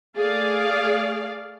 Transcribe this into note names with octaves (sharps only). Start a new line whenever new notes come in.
A3 G#4 D5 F5